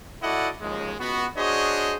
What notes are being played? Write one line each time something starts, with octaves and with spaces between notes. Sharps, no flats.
E4 F#4 A4 D5 D#5 F#5
D#2 C#3 F3 G#3
C#2 B3 F#4
D4 F#4 G#4 C5 C#5 D#5